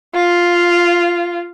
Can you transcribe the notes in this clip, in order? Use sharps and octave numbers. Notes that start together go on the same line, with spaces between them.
F4